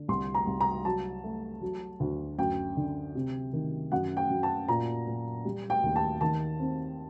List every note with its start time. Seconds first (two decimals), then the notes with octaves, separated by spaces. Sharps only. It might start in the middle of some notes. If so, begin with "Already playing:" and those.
Already playing: D3
0.08 C2 C6
0.35 A#5
0.47 C2
0.61 A#5
0.85 F#3 A5
1.24 A3
1.61 F#3
2.00 D2
2.38 F#2 G5
2.77 D3
3.15 C3
3.53 D#3
3.92 F#2 F#5
4.17 G5
4.30 F#2
4.43 A5
4.68 A#2 A#5
5.07 A#2
5.45 G3
5.70 G5
5.83 D#2
5.96 A5
6.21 D#3 A5
6.60 C4